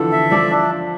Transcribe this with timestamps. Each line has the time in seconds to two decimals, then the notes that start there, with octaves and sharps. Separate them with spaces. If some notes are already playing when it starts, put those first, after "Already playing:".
Already playing: D3 E3 F3 A4
0.12 E5
0.31 F3 D5
0.50 D4